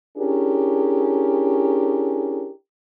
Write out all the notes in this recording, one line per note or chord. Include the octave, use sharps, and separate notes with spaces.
C#4 D4 E4 G4 G#4 A#4